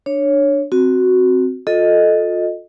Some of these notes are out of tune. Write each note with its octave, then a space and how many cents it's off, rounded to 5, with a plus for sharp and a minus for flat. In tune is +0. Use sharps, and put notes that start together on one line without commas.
D4 +10 C#5 +0
C4 +0 F#4 +0
F4 +35 A4 +0 D#5 +0